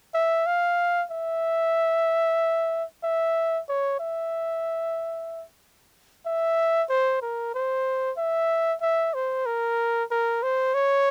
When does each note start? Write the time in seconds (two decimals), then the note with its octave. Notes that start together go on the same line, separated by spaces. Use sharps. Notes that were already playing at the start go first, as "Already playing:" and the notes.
0.14 E5
0.46 F5
1.11 E5
3.03 E5
3.69 C#5
4.00 E5
6.26 E5
6.89 C5
7.22 A#4
7.54 C5
8.17 E5
8.81 E5
9.14 C5
9.46 A#4
10.11 A#4
10.43 C5
10.74 C#5